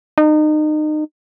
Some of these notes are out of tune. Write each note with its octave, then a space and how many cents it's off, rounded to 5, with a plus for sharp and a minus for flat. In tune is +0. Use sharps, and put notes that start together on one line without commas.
D#4 -30